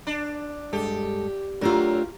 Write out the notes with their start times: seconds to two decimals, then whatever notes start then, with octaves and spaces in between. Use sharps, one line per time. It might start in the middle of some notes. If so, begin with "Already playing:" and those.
0.07 D4
0.73 G2 G#3 G4 A4
1.61 F#3 A3 D4 F4 G4 A#4